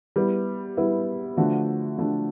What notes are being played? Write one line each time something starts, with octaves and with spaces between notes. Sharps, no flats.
G3 B3 E4
G3 B3 E4
D3 F3 A3 D4 F#4
D3 F3 A3 D4 F#4